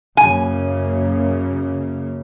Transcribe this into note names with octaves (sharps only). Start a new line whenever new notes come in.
F#2 C#3 A#3 G#5